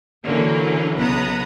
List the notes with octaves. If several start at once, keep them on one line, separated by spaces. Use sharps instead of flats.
D3 E3 F#3 A#3 C#4
B1 C#3 B3 B4 A#5 D#6